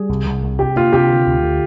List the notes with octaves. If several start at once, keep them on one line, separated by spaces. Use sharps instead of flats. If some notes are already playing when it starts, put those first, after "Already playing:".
Already playing: G3 G#4
C2
C2
C2
C3 G4
A#3 F4
C3 G4
D3
D2
D3